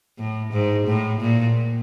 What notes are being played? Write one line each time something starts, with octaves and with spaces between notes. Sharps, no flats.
A2
G#2
A2
A#2